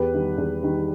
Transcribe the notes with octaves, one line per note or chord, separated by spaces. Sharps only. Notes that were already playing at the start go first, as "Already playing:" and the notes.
Already playing: E2 G4 B4
D#3 G3
E2
D#3 G3